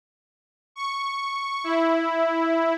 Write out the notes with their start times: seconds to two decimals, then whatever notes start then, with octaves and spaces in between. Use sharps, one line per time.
0.76 C#6
1.64 E4